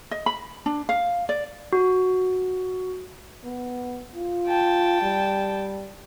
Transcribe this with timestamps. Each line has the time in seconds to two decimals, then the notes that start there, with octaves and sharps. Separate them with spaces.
0.11 D#5
0.26 B5
0.66 D4
0.89 F5
1.29 D5
1.73 F#4
3.45 B3
4.15 F4
4.47 G5 A5
5.02 G3